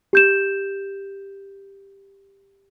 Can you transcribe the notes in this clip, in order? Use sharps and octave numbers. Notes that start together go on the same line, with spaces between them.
G4 G6 E7